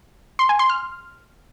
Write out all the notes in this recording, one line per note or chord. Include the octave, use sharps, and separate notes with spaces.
C6
G#5
C6
F6